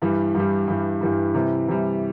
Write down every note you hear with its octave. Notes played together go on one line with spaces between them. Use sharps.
G2 E3 G3
G2 E3 G3
G2 E3 G3
G2 E3 G3
C3 E3 G3
C3 E3 G3